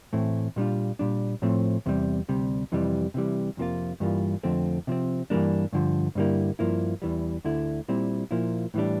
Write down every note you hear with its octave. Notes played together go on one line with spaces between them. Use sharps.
A2 E3 A3 C4 E4
A#2 G3 D4 F4
A#2 G3 D4
A2 F3 A3 C4
E2 C3 G3
D2 C3 G3
F2 C3 E3 G3
C3 E3 G3
F2 C3 F3 A#3 F4
G2 E3 G3 A#3 F4
F2 D3 F3 A3 C4
C3 F3 C4
G2 E3 G3 A#3 D4
G2 D3 F3
G2 D3 G3 A#3 E4
G2 F3 A#3 E4
E2 E3 G3
D2 D3 A3 E4
A#2 G3 C4 E4
A#2 F3 A#3 E4
A2 E3 G3 D4